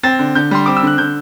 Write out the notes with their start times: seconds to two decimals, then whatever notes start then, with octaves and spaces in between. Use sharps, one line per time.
0.03 C4 A6
0.19 D3
0.35 D3 G6
0.51 G3 C6
0.66 C4 D6
0.77 E6
0.82 D3 F#6
0.98 D3 G6